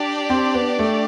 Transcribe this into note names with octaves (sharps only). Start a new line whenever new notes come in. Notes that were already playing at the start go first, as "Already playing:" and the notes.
Already playing: D4 G4 D5
C4
B3
A3